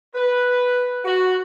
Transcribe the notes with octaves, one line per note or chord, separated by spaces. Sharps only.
B4
F#4